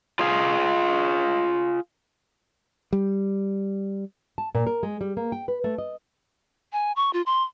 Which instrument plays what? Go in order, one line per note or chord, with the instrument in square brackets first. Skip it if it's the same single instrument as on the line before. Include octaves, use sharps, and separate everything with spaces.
[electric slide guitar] F4 G#4 F5
[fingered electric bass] G3
[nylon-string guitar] A5
A#2
A#4
G#3
G3
A#3
G5
B4
A3
D#5
[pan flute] G#5
C#6
F4
C6